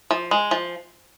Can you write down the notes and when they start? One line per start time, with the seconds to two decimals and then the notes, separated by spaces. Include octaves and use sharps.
0.11 F3
0.31 G#3
0.51 F3